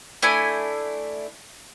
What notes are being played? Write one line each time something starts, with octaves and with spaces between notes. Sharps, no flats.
A3 D4 E4 G#5